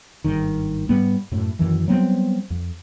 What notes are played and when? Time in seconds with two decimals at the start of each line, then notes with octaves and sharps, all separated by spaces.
0.24 G#1 G2 D#3
0.89 G#2 G3 B3
1.32 F#2 A2
1.59 F#2 D#3 E3
1.88 F#3 G3 B3 C4
2.50 F2